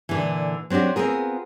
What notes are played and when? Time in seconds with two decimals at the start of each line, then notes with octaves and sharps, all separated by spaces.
0.09 A#2 D3 E3
0.70 F#3 C4 D4 F#4 G4
0.96 B3 C4 D#4 F4 G#4 A#4